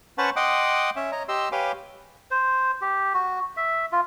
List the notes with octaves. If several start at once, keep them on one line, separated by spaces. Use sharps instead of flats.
C#4 B4 C5 F#5 A5 C#6
D#5 F#5 G5 C6 D6 D#6
C#4 E5
C#5 D#5 A#5
G4 D#5 C6 E6
G4 B4 C#5 F5 G#5 D6
C5
G4
F#4
E5
F4